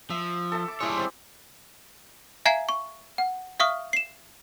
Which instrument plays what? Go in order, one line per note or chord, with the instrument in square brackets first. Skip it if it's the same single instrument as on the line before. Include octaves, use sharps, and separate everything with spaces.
[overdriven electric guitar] F3 [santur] E5
[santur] A4 E5 A5
D6
[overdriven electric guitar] G3 C#5 [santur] G#3 E4 E5
[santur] C4 D5
[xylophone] E5 F5 G#5 A#5 G#6 C7
C#6
F#5
E5 F5 C#6 D#6 F6
C7 E7